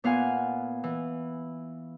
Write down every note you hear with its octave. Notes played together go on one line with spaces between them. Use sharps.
A#2 B3 F4 F5 F#5 G#5
E3